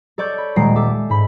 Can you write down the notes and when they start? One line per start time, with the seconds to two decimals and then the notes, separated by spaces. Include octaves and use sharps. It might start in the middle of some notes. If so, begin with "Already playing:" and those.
0.18 A4 C#5 D5 C#6 G6
0.38 B5
0.56 D#1 G#3 A#5 C7 D7
0.76 A4 E5 D6
1.10 G#2 B5